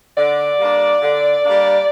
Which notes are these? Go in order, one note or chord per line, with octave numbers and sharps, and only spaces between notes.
D3 D5
G3 A#3 D4
D3
G3 A#3 D4